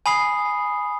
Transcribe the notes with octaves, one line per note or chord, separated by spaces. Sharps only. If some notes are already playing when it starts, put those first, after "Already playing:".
G#5 B5 D#6 C7